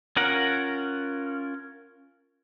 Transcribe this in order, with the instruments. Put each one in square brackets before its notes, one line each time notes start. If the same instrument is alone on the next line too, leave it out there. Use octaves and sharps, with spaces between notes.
[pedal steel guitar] C#4 F4 A#4 F#5